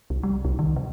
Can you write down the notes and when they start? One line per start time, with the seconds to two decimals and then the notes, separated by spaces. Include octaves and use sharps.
0.10 C2
0.23 G3
0.45 C2
0.59 D#3
0.76 C3